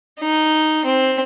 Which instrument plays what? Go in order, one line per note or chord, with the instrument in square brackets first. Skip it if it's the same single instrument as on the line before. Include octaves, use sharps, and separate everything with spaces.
[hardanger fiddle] D#4
C4